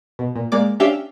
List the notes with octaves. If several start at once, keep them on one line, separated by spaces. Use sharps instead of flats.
B2
A#2
G#3 A#3 D5 D6
C#4 D4 G4 E5 F5 G5